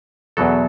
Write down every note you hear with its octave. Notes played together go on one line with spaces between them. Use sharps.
E2 B2 F#3 A4